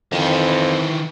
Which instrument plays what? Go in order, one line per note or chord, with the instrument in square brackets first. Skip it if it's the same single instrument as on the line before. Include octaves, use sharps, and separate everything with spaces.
[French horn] F2 [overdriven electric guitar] D#3 E3